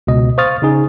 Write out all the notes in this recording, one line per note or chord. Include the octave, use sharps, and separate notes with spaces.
C#2 B2 D#5
C5 F5 C#6 D#6 F6 A6
C#3 D#4 G#4